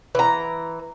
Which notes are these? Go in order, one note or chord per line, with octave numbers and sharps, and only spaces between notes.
E3 A#5